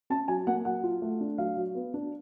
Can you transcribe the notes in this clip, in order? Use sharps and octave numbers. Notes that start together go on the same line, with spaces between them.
C#4 A5
F#3 G#5
A#3 F#5
F#3 F#5
F4
A3
D4
F#3 F5
F#3
B3
D4